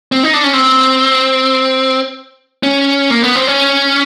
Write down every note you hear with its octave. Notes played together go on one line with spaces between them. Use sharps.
C4
D#4
D4
C#4
C4
C#4
A#3
B3
C4
C#4